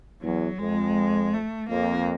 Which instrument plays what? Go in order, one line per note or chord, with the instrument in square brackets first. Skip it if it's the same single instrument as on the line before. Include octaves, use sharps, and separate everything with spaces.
[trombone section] E2 [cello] F#3
[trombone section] F2 [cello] G#3
[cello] A3
[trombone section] F2 [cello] A#3